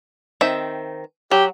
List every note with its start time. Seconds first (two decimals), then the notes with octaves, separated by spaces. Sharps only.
0.41 D#3 C4 E5
1.31 F#3 G4